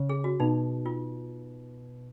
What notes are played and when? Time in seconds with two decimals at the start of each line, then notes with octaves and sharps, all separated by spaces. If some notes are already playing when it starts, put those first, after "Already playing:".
Already playing: C#3
0.09 G#4
0.24 F#4
0.40 B2 D#4
0.86 F4